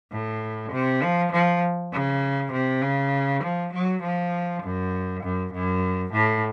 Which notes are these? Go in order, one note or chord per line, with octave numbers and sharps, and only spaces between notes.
A2
C3
F3
F3
C#3
C3
C#3
F3
F#3
F3
F#2
F#2
F#2
A2